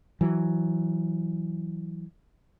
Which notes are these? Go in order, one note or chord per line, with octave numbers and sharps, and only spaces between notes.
E3 F#3